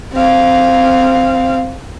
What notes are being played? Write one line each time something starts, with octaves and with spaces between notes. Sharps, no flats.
C4 F5